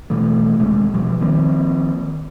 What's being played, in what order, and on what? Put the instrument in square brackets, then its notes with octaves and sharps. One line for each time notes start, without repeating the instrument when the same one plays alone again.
[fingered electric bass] B2 E3 G3 A3
D#1 C3 G#3
B2 F3 G3
D#3 F3 A#3 C4